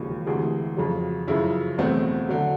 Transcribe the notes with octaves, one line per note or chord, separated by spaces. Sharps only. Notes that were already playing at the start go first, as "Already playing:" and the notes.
Already playing: E1 D#2 C#3 F3
D2 C3 E3 G#4
F2 C#3 F#3
F#2 C#3 F3 E4
E2 B2 F#3 A3 C4
D3 F#3